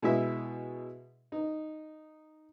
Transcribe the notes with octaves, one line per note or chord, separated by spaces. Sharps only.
B2 G#3 E4 E5
D#4